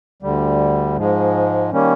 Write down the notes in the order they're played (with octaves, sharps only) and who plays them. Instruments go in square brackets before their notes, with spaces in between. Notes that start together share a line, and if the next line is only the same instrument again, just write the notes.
[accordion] D2 D3 G3
G#2 F3 G#3
D#3 G3 A#3 C#4